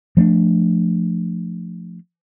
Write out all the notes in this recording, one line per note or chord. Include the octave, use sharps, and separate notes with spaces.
F3 A3 A#3 D4